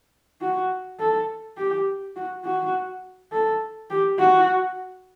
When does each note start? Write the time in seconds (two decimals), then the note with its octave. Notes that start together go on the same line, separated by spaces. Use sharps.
0.41 F#4
0.99 A4
1.57 G4
2.16 F#4
2.45 F#4
3.32 A4
3.90 G4
4.19 F#4